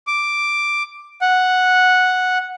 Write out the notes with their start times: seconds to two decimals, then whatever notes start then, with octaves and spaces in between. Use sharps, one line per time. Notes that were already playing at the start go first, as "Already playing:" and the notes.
0.07 D6
1.21 F#5